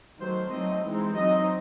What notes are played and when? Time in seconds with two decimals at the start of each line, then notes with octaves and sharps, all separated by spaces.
0.18 D#3 F#3 A3 C5
0.51 F#3 A3 C4 D#4 D#5
0.83 E3 G#3 C4 D#4
1.15 F#3 C4 D#4 D#5